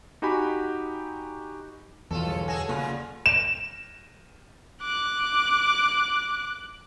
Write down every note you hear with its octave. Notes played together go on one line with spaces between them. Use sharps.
D#4 F#4 G4 G#5 B5
B1 E2 G2 E3 F4 A4
G1 G#4 C#7
G#4 A4 F#5 G#6 A#6
A#2 C#3 A#3 F4 B5
E7
D6 F#6